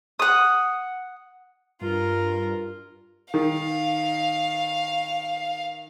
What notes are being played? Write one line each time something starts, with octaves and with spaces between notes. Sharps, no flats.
F#5 D#6
G2 F4 A#4
D#3 F5